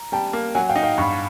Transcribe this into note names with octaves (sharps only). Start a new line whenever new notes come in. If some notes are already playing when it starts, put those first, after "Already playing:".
Already playing: A#5
G3 G5 A5
A#3
F#3 F#5 G#5
F5 G5
D#4
F5 G5
G2 B5 C#6